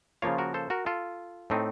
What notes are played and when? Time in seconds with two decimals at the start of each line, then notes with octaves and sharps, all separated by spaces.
0.22 C#3 F3 A#3 F4 C#5 F5
0.38 F#4 A#4
0.54 A4 C5
0.70 F#4 A#4
0.86 F4 A4
1.50 A2 A3 C4 D#4